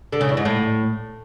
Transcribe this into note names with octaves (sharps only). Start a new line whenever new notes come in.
D3
C#3
E2
G#2
A2